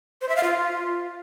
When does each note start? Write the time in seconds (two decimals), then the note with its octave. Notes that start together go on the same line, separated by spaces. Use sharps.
0.21 C5
0.29 E5
0.36 F5
0.43 F4